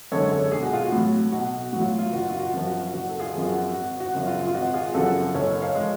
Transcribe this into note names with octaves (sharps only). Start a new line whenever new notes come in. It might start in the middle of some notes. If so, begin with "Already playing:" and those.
F#2 D3 G#3 A4 C#5
A4 C#5
B1 G#4
F#4
F4
F#4
A2 F#3
B1 F#4
A2 F#3 F#4
F4
F4
F#1 F#4
F4
F#4
F#2 F3
F#4
F#1 F#4
A4
F4 G#4
F#2 F3
F#4
G#1 F#4
F#4
F#2 C#3 F3
F4
F4
G#1 F#4
F4 G#4
F#2 C#3 F3 F#4 A4
F#1 A4 C#5
C#5 F5
F3 G#3